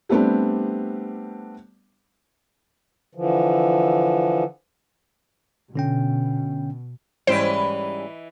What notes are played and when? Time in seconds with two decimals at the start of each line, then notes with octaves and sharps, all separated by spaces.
0.09 G3 A3 B3 C4 D4 G4
3.15 D3 E3 F3
5.76 B2 D3 C#4 G5
7.27 G#2 E3 G3 C#4 E4 C5 D#5